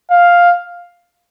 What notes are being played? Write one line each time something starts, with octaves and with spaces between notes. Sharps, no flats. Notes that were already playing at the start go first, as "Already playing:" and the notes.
F5